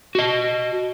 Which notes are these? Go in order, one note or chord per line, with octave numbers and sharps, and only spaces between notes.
F#4 D#5